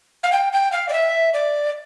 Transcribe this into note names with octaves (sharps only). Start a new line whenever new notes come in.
F5
G5
G5
F5
D5
E5
D5